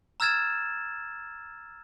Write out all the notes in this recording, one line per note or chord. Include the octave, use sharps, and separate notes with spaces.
A#5 E6 F6 G#6 A6 E7